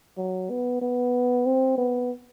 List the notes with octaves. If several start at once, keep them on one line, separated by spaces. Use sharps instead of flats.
F#3
B3
B3
C4
B3